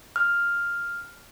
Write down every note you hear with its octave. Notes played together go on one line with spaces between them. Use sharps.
F6